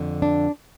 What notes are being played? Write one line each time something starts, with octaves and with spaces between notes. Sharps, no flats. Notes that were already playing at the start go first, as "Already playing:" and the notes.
Already playing: F2 D3
D4